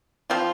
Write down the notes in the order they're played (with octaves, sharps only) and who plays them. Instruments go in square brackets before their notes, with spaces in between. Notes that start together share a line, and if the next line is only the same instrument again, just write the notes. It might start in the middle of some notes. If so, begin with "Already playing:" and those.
[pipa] F3 C4 F4